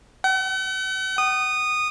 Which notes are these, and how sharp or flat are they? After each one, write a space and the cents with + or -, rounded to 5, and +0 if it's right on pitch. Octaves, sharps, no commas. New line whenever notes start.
F#5 +45
D#6 -15